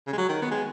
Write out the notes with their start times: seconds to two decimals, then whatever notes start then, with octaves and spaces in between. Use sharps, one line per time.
0.07 C#3
0.13 G#3
0.18 F#3
0.29 D#3
0.42 B3
0.51 G#3